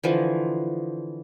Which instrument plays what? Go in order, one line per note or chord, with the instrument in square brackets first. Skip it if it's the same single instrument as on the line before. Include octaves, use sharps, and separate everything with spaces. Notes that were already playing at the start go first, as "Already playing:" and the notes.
[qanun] D3 E3 F3